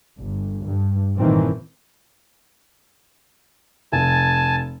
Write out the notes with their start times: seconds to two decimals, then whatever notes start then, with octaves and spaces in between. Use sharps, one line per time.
0.18 G1
0.64 G2
1.17 G#1 G2 A#2 D#3 E3 C4
3.92 F1 G#5 A5